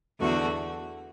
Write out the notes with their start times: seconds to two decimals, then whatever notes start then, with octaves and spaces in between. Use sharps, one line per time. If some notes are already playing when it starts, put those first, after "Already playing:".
0.20 E2 D3 A3 F#4